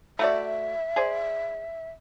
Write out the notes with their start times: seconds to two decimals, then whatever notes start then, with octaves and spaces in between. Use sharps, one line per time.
0.19 A3 F#4 D5 E5
0.96 G#4 C5 D5